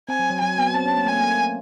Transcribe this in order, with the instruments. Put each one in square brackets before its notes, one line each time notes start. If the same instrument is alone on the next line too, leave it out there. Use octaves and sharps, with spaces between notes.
[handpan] C4 [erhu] G#5
[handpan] F#3
F#3
[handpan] F#3 [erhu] G#5
[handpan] B3
[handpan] C4 [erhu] A5
[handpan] C#4
A#3
[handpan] A3 [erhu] G#5
[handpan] A#3